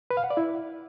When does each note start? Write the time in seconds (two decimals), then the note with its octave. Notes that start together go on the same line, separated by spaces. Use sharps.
0.11 B4
0.17 F5
0.24 F#5
0.30 D5
0.37 E4